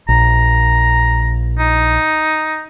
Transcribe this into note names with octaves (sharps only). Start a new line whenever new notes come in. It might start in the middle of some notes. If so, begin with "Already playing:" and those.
A#1 A#5
D#4